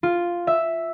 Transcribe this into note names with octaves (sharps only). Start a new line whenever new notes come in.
F4
E5